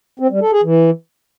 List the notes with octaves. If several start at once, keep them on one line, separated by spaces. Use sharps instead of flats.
C4
G3
A4
G#4
E3